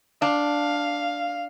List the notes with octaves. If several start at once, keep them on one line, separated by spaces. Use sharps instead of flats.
D4 F5